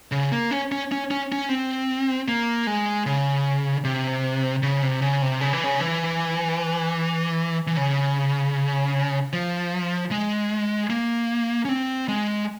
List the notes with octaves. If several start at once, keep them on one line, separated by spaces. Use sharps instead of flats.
C#3
A#3
C#4
C#4
C#4
C#4
C#4
C4
A#3
G#3
C#3
C3
C#3
C3
C#3
C3
C#3
E3
C#3
E3
E3
C#3
F3
G#3
A#3
C#4
C4
G#3